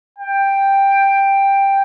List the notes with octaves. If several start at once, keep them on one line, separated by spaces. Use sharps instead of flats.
G5